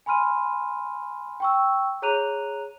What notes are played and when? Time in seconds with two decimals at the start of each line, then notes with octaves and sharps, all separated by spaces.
0.06 G#5 B5 C6 F6 D#7
1.40 G5 C#6 E6
2.02 G#4 C#5 A#5 F#6 D#7 F7